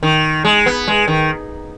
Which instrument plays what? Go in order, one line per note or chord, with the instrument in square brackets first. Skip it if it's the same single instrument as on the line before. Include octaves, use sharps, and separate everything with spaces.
[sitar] D#3
G#3
B3
G#3
D#3